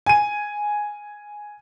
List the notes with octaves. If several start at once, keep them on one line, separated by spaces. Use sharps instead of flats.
G#5 D#7